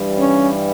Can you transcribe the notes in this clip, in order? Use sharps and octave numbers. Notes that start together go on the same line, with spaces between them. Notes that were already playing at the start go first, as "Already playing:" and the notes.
Already playing: G2 E3 G3
C#4